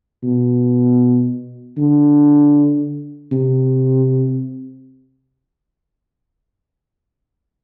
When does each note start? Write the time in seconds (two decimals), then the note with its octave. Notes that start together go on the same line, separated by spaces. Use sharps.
0.23 B2
1.78 D3
3.32 C3